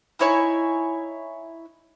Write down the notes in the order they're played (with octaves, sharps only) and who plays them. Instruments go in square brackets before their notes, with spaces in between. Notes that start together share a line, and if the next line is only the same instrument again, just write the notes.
[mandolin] D#4 E4 C#5 G#5